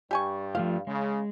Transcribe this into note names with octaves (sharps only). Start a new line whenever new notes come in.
G2 G3 G4 G#5 C#6
F3 A3 F4 F5
C#3 G#3